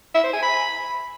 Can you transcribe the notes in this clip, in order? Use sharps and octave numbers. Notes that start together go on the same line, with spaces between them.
E5
C5
G#5
B5